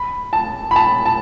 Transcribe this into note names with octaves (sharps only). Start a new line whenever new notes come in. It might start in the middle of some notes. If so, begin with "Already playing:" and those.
Already playing: B5
A5
B5
A5
A5